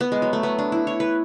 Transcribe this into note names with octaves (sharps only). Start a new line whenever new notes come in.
B3
G#3
F#3
A3
B3
D4
E4
C#5
B4